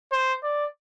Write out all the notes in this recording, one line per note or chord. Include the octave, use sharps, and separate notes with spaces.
C5
D5